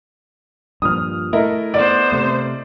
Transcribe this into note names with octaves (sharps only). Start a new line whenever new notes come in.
G2 A#2 F3 D#6 F6
A3 E4 A#4 D#5
B3 C5 D5
C3 A3